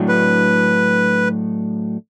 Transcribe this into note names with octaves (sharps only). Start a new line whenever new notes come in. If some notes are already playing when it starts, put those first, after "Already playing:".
Already playing: A2 F#3 A3 D4
B4